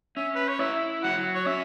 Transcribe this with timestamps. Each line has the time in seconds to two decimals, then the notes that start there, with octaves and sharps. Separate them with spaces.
0.16 C#4 E5
0.35 B4
0.48 C#5
0.59 E4 E5
1.03 F#3 F#5
1.35 C#5
1.46 C#4 E5